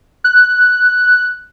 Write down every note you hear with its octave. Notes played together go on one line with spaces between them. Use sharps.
F#6